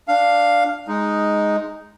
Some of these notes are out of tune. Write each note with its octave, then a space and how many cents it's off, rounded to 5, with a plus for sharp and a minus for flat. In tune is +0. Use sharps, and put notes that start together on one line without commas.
D4 +0 F5 +0
G#3 +0 D#4 +0